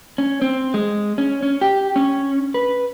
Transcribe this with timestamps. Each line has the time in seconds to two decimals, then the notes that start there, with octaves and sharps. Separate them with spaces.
0.18 C#4
0.42 C4
0.74 G#3
1.18 C#4
1.43 C#4
1.61 G4
1.96 C#4
2.54 B4